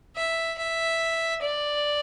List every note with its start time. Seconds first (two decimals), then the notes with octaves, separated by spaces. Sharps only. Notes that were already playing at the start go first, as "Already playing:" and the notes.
0.16 E5
0.58 E5
1.42 D5